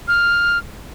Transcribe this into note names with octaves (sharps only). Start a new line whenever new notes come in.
F6